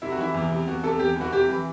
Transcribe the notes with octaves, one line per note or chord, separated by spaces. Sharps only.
C3 E4
F#4
E3 E4
E2
C3
E2 F#4
C3 A4
E2 G4
E3
F#4
C3 G4
E3